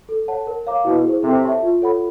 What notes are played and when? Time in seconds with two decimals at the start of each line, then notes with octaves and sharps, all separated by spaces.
0.09 A4
0.28 C#5 F#5 A5
0.47 A#4
0.67 C#5 F5 A#5 D6
0.85 B2 E4
1.05 G#4 C5
1.24 C3 A4
1.43 C#5 E5 A5 C#6
1.62 F4
1.82 A4 C#5 F#5 B5